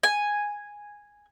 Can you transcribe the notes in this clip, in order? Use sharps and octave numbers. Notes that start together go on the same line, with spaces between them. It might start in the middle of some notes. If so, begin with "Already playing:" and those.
G#5